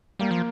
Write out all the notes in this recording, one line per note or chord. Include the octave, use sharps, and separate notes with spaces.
G3 A#3
F3